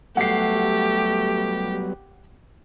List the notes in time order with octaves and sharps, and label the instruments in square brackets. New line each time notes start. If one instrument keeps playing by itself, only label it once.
[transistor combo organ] F#3 G3 B3 [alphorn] A3 [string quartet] G4 [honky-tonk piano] F#5 C7